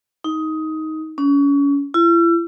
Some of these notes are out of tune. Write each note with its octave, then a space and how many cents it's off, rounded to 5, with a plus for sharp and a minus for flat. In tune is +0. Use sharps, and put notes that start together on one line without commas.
D#4 +15
C#4 +30
E4 +40